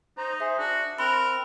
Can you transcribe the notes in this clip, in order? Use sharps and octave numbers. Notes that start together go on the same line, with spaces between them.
D#4 C5 A#5
G#4 C5 E5
D4 F#4
C4 A#4 B5 C6 F#6